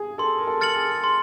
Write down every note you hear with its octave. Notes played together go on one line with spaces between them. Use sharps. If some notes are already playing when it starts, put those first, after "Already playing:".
Already playing: G#4
A4 C6
A#4
A4
F6 A6 C#7 F#7
G#4
C6